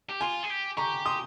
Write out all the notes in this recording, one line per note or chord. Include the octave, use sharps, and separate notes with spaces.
G4
F4 G#5 C6
G#4
G4
G4 A#5 C#6
C6 D#6